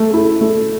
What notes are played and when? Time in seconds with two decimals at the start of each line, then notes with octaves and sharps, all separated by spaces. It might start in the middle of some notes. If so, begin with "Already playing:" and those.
Already playing: A3
0.11 E4 A4
0.41 A3